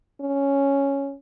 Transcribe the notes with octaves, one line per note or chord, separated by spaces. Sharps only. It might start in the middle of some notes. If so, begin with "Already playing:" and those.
C#4